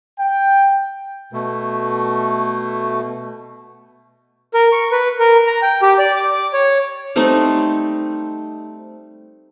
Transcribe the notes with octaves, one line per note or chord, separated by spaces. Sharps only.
G5
B2 A3
A#4
C#6
B4
A#4
A#5
G5
G4
D5
D6
C#5
G3 A3 C4 D#4